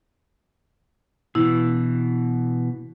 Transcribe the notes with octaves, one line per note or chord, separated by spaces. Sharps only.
B2 E3 E4